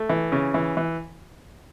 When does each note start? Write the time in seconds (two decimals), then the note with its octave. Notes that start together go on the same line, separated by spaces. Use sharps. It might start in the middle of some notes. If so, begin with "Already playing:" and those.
Already playing: A3
0.09 E3
0.32 C#3
0.54 E3
0.77 E3